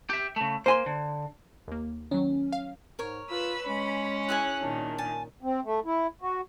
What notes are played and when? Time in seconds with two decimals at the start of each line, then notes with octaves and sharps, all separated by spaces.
0.10 G4 E5
0.36 C#3 A3
0.66 A#3 C5 G#5 C6
0.86 D3
1.68 D#2 A#3
2.11 D#3 F#3 C#4
2.53 F5
2.99 G#2 A#4 C#5
3.30 F4 B4 B5 E6
3.67 G#3 C#4 B5
4.29 E4 G#4 G#5 F#6
4.61 A#2 D#3 D4
4.98 G#5 A5
5.43 C4
5.64 A3
5.85 E4
6.21 F#4